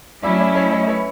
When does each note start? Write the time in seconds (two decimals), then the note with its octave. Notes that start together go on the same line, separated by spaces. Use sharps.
0.23 F#3 A3 C#4 E4 D5 E5
0.39 D5 E5
0.55 C#5 D#5
0.72 C#5 D#5
0.88 B4 C#5